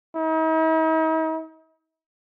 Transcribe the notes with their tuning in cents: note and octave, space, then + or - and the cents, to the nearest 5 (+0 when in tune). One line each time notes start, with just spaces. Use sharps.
D#4 +45